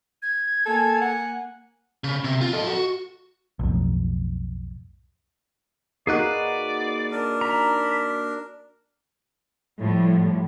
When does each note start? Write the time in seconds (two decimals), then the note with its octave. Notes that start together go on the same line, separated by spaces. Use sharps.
0.22 G#6
0.66 A#3 A4 G#5
1.01 F#5
2.04 C#3
2.24 C3
2.41 F4
2.53 A4 D#5
2.67 F#4
3.59 B1 F2 A2
6.07 A#3 D#4 F#4 G#4 B4 D5 F#6
7.12 D4 A#4
7.41 A#5 B5
9.80 A2 F3 G3